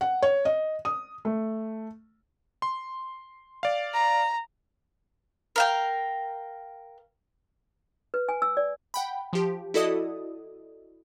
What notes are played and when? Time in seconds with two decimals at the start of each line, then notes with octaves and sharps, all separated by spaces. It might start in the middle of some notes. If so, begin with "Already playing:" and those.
0.01 F#5
0.22 C#5
0.45 D#5
0.85 D#6
1.25 A3
2.62 C6
3.63 D5 F5
3.93 A#5
5.56 A#4 F5 G5
8.14 B4
8.29 G#5
8.42 E6
8.57 D5
8.94 F#5 G5 B5
9.33 F3 G4
9.74 E4 F#4 A4 D5 D#5 D#6